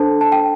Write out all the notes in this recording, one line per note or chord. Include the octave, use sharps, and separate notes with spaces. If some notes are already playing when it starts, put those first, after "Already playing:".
Already playing: D4 A4 C5 A5
A5
G5